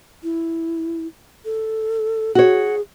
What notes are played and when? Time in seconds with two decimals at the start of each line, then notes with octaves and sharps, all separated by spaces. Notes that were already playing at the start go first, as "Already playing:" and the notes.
0.23 E4
1.45 A4
2.35 F#4 G#4 C#5